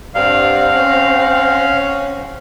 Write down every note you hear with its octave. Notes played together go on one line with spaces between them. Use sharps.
G2 C4 F5 F#5
C#4